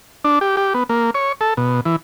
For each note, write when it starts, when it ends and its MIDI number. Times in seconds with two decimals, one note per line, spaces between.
0.25 0.39 62
0.41 0.56 67
0.57 0.73 67
0.74 0.83 59
0.89 1.10 58
1.15 1.32 73
1.41 1.54 69
1.57 1.80 47
1.85 1.96 52